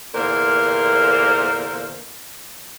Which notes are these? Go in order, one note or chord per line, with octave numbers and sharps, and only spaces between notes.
E2 A#2 D3 A#3 A#4 C5